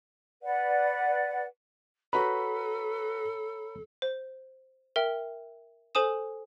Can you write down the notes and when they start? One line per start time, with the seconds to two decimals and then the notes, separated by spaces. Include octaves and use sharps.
0.43 B4 D5 F#5
2.13 F#4 A4 B4 C#5 A#5 B5
4.02 C5
4.96 A#4 E5 G5
5.95 A4 C5 G#5 D#6 E7